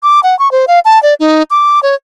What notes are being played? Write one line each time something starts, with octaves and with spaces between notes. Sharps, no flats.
D6
F#5
C#6
C5
F5
A5
D5
D#4
D6
C#5